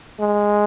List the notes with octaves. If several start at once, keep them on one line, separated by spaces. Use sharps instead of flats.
G#3